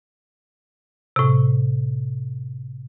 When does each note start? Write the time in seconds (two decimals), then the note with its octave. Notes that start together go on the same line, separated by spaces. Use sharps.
1.16 A2 C3